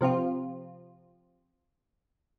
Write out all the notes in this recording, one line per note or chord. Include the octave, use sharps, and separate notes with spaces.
C3 F3 C4 F4